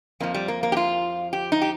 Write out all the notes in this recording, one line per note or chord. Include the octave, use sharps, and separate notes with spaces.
F2 F3 A#3
G3
A#3
A#3
G4
F4
G4
D#4
G4